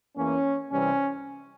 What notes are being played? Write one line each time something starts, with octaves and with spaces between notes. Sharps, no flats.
E2 E3 A#3 C#4
C2 C3 E3 G3 C4 C#4